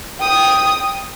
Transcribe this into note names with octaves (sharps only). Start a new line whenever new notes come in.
G5 D#6